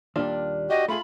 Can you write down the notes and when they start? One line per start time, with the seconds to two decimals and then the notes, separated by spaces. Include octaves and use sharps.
0.16 D#2 A#2 G3 D4 F4
0.70 F#4 G4 D#5
0.88 A3 F4 G#4 B5